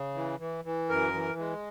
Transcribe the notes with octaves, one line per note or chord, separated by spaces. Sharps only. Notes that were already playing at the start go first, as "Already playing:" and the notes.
Already playing: C#3
E3
E3
E3
F#2 A#4
E3
G#3